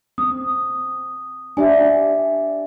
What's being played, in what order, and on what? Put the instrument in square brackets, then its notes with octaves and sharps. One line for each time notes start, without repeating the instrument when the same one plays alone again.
[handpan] C4 [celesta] D#6
[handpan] D4 G4 D5 [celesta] E5 G#5